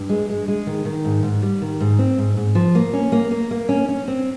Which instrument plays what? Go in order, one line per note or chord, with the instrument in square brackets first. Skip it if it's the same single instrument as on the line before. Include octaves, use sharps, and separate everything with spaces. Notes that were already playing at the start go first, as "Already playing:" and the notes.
Already playing: [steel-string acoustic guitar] G2
G#3
G#3
G#3
D#3
D#3
G#2
G#2
G3
D#3
G#2
C4
G#2
G#2
F3
A#3
C#4
A#3
A#3
A#3
C#4
C#4
C4